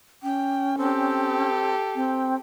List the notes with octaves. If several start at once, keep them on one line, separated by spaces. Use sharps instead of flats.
C#4 G5
C4 G4 A4
C4 G5